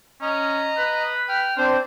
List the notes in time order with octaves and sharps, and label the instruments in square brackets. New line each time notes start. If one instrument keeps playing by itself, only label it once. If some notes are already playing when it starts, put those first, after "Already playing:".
[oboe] C#4 [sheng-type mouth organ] D#5 A#5
[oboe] B4
[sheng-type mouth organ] G5 F6
[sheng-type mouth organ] C4 D4 [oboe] C5